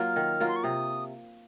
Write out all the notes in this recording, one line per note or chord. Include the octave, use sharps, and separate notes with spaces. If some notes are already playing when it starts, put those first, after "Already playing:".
Already playing: F#3 A#3 F4 F6
D#3
F#3 A#3 F4
C6
C#6
C3 D#6